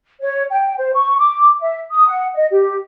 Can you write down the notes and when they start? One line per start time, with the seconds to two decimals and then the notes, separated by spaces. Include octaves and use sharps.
0.22 C#5
0.50 G5
0.77 C5
0.93 C#6
1.18 D6
1.60 E5
1.90 D#6
2.07 F#5
2.35 D#5
2.50 G4